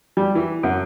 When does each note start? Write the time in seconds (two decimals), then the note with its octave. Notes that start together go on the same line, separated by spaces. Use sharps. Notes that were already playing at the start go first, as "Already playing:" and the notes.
0.17 G3
0.35 E3
0.63 F#2